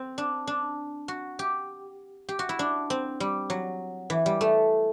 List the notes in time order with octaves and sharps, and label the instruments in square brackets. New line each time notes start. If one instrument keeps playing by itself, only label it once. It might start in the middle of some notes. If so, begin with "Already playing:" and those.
Already playing: [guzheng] C4
D4
D4
F#4
G4
G4
F#4
E4
D4
C4
G3
F#3
E3
G3
A3